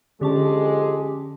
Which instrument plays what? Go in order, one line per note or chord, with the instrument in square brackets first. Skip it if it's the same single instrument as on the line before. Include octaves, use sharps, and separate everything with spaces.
[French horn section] F2 G#3 [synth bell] D3 C#4 A5 [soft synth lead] G4